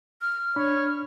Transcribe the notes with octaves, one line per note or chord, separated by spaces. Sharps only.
F6
D4 C#5 B5